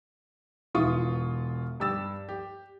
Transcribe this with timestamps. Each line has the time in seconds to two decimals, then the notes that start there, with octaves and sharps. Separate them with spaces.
0.75 E1 E3 F4 C#6 D#6
1.80 G2 G4 E6 A6 E7
2.29 G4